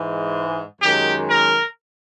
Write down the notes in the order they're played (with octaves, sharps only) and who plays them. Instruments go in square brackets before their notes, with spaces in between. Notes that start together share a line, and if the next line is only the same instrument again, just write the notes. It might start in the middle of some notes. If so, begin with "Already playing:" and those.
Already playing: [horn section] G#2 E3 G#3
F#2 D#3 G#3 G4
A#4